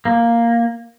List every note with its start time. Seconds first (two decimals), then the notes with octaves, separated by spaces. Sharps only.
0.05 A#3